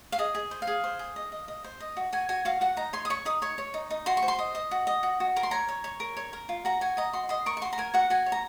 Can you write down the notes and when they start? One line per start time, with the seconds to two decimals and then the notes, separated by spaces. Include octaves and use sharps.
0.12 F5
0.18 G#4 D#5
0.35 G#4
0.51 C5
0.62 F5
0.67 G#4
0.84 C5
0.99 G#4
1.16 D#5
1.32 D#5
1.48 D#5
1.64 C5
1.80 D#5
1.97 F#4
2.12 F#4 G#5
2.29 F#4 G#5
2.45 F#4 F5
2.61 F#4 F#5
2.77 D#4 A#5
2.93 C#5 C6
3.05 D#6
3.10 C#5 C#6
3.25 D#4 D#6
3.42 C#5 C#6
3.58 C#5
3.74 D#4
3.90 D#4
4.06 F#4 C6
4.17 C#6
4.22 C5
4.28 C6
4.39 D#5
4.55 D#5
4.71 F#4
4.87 D#5
5.03 F#4
5.20 F#4
5.36 A#4 A#5
5.43 C6
5.51 C#5 A#5
5.68 C#5
5.84 C#5
6.00 A#4
6.17 C#5
6.33 A#4
6.49 F4
6.65 F#4 A#5
6.81 F#4 G#5
6.97 D#5 A#5
7.13 F#4 C6
7.29 D#5 C6
7.46 A#4 C#6
7.57 C#6
7.61 F#4 C6
7.73 A#5
7.78 A#4 G#5
7.94 F#4 F#5
8.10 F#4 G#5
8.26 C#5
8.32 A#5